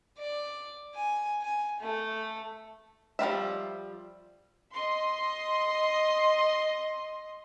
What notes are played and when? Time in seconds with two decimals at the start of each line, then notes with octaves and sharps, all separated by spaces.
0.18 D5
0.95 G#5
1.41 G#5
1.80 A3
3.19 F3 G3 C4 E5
4.72 D#5 C6